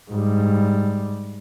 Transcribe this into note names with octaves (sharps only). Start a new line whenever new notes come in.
G#2 G3